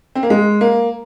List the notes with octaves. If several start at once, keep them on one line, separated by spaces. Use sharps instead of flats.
C4
A#3
G#3
A#3